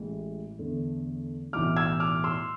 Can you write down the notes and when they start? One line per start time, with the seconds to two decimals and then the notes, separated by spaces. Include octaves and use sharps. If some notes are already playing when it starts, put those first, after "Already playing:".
Already playing: A1 A2 E3 G#3
0.59 E2 D3 A3
1.53 B1 A2 E3 D6 F6
1.77 E6 G#6
2.00 D6 F6
2.24 C6 E6